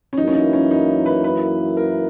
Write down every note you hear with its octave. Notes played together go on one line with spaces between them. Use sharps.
C#4
F#2 E3 A#3 D#4 E4
C#4
D#4
C#4
D#4
B4
B4
A#4